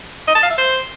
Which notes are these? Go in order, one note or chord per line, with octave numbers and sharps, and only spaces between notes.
D#5
A5
F5
E5
C5